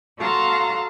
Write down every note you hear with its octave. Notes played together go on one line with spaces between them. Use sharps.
F#4 A4 F5 A5 A#5 C6